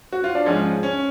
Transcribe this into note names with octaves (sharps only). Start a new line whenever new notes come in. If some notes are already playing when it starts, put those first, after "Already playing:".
F#4
F4
D4
G#2 F3 G#3 C#4
C#4